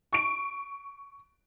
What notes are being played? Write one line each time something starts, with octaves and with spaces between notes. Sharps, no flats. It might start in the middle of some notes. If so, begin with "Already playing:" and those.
C#6 D7